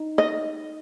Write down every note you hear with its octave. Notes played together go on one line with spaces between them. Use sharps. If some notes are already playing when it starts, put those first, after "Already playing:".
Already playing: D#4
D#5